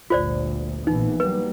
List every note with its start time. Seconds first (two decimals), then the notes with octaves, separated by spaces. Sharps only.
0.10 G1 D2 A#2 F4 C5 D5
0.87 A#1 E3 B3 D#4
1.20 F#3 G3 A#3 B4